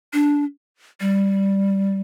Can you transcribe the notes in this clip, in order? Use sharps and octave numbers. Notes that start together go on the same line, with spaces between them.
D4
G3